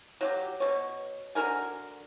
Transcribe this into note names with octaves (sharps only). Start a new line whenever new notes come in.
F#3 F#4 G4
B2 C#5
D3 F#4 A#4 G#5